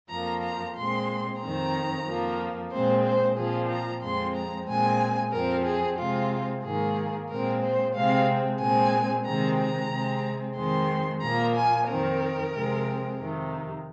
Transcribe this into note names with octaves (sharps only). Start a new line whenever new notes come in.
F2 F3 A#3 A#5
A#5
A#2 G#3 C4 C6
F2 D#3 C4 A#5
F2 F3 A#3
A#2 G#3 C4 C5
C5
A#2 F3 C4 G#4
A#5
F2 F3 G#3 C4 C6
A#5
A#2 G#3 C4 G#5
F2 F3 C4 A#4
G#4
C3 G#3 C4 F4
G#2 D#3 A#3 G#4
A#2 G#3 C4 A#4
C5
C3 G#3 C4 F5
A#2 G#3 C4 G#5
C3 D#3 G#3 C4 A#5
A#5
C3 G#3 C4
F2 D#3 G#3 C4 C6
A#2 F3 A#3 A#5
G#5
F2 D#3 C4 A#4
C3 F3 G#3 C4
F2 C3 D#3